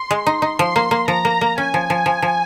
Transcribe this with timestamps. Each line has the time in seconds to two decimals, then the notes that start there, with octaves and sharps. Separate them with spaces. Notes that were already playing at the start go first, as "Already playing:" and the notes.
Already playing: C6
0.11 G#3
0.26 D#4
0.42 D#4
0.59 F3 C6
0.76 A#3
0.91 A#3
1.08 F3 A#5
1.25 A#3
1.41 A#3
1.58 C#4 G#5
1.74 F3
1.90 F3
2.06 F3
2.22 F3